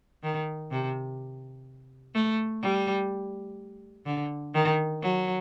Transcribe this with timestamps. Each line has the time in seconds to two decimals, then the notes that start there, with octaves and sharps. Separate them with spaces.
0.23 D#3
0.71 C3
2.15 A3
2.62 G3
4.06 D3
4.54 D#3
5.03 F#3